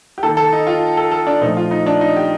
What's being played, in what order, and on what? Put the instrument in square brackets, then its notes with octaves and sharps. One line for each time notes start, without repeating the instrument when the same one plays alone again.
[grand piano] G4
D#3 A#3 A4
A4
D#4
F4
A4
A4
D4
A#2 F3 A3 D#4
F4
D#4
D4
D#4
G4